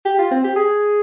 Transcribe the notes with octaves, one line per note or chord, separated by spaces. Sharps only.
G4
F4
C4
G4
G#4